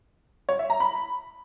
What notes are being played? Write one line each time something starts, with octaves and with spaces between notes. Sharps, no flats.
C#5
E5
A#5
B5